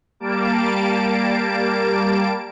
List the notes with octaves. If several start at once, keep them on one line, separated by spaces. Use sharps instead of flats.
G3 A#3 A5 D7